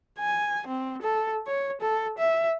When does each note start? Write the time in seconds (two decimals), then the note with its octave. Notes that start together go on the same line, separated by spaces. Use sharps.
0.19 G#5
0.67 C4
1.02 A4
1.47 C#5
1.81 A4
2.18 E5